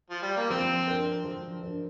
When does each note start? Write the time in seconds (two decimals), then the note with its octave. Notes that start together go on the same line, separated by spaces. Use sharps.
0.10 F3
0.22 G3
0.37 A#3
0.50 F3 C4
0.87 D4 A#4
1.24 F3
1.62 D4 A#4